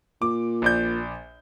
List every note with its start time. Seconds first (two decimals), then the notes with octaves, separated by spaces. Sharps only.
0.22 A#2 D6
0.62 A#1 D5 G6